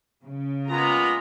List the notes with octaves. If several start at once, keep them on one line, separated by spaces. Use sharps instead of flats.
C#3
G#3 A#3 B3 F4 A#5